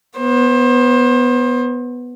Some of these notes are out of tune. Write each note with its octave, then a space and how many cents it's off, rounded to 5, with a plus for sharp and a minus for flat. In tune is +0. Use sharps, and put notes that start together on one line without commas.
B3 +0 C5 +30